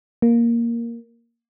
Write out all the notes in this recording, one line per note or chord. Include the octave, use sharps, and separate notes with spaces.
A#3